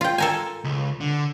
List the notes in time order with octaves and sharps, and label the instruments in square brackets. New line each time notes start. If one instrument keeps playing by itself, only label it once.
[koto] F4 G5
A4 A#4 G#5
[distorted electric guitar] C#2
D3